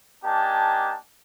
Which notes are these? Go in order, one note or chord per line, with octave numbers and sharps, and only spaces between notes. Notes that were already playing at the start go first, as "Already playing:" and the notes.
A#3 D4 D#4 G4 G#5 A5